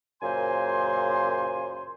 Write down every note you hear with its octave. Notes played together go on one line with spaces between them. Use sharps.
F#2 A#2 C#3 C5 G#5 C6